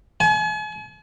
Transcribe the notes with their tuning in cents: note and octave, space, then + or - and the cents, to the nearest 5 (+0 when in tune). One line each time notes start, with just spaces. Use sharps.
G#5 +40